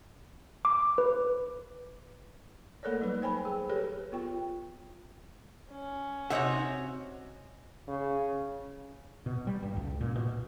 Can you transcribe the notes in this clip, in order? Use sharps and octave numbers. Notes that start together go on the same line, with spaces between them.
D6
B4
A3 A#3 A4 A#4 C#5 D5
F#3 G3 D#4 B4
C5 G5 G#5 B5
G#4
G4 A4 B4 C#5
B3 F4 G5
C#4
C3 D#4 F#4 C#5 E5 F#5
C#3
B2
G3
G2
C#2
A#2
B2